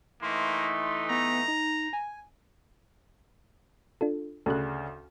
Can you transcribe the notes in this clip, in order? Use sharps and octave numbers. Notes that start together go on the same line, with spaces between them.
E3 A3 A#3 D#4 C6
B3 A#5
D#4
G#5
D4 F4 A4
D2 C#3 A4 F#6